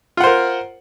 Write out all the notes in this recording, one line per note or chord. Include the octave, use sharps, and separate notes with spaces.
F4 A#4 C5 F#5